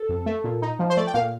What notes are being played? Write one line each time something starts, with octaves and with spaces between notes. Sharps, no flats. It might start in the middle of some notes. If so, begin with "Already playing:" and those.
Already playing: A4
F2
A3
A#2
D#4
F3
C5
A3 D5
G5
A#2 F5